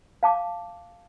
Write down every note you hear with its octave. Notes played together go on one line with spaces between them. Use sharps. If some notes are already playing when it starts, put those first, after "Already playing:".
F5 A5 D6